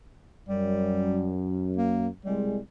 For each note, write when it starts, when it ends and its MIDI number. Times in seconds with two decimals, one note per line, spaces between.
0.49 2.08 42
0.49 1.31 55
1.77 2.08 58
2.25 2.58 36
2.25 2.59 55
2.25 2.58 56